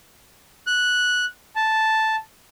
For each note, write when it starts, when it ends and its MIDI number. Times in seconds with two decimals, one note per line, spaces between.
0.67 1.25 90
1.56 2.16 81